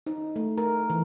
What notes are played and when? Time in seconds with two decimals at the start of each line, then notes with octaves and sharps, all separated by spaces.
0.06 D#4
0.36 A3
0.58 A#4
0.90 E3